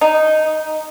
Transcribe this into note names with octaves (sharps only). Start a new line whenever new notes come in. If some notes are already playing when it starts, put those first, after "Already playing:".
D#4